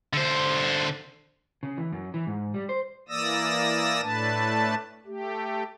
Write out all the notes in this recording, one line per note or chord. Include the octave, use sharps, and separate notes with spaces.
D3 C5
C#3
E3
F#2
E3
G#2
G3
C5
E3 A#3 D5 D#6 E6 A#6
A2 A3 D4 B4 A5
A3 G4